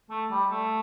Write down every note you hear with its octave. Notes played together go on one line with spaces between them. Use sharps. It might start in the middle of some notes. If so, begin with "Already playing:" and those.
A3
G3
A3